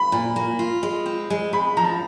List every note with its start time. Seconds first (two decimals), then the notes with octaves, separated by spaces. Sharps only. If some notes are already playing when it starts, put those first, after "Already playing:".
Already playing: B5
0.12 A#2
0.36 A#3
0.59 F4
0.83 G#3
1.06 C4
1.30 G#3
1.53 G#3 B5
1.77 F3 A#5
1.85 A5